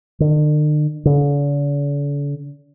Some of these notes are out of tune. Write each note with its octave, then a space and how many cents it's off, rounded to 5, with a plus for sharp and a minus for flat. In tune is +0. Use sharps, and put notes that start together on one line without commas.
D3 +45
D3 -45